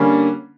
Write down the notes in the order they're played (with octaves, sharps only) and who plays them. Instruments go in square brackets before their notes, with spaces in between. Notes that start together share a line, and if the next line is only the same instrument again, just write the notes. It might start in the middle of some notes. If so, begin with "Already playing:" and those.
Already playing: [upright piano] D3 G3 A#3 C#4